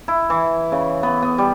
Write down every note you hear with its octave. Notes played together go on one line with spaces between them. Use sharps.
E4
E3
C#3
B3
B3
G3